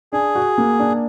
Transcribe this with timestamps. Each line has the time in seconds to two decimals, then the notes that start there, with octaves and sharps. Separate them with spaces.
0.13 D4 G#4
0.35 F#4
0.58 A#3
0.79 D4